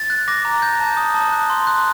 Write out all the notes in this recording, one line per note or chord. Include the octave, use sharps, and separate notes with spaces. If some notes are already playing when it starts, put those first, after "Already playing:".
Already playing: A6
F#6
D6 A#6
A#5
G6
A5
D#6
A5
F#6
C6
F#6